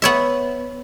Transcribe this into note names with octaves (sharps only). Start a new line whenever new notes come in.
B3 C#5 E5